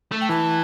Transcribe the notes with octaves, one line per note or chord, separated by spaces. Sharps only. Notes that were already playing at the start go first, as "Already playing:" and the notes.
A3
G5
E3 A5